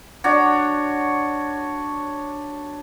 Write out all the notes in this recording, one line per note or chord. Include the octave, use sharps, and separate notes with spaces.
D4 F#4 C#5